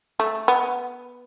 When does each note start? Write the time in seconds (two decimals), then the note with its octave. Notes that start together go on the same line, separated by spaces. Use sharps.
0.20 A3
0.48 B3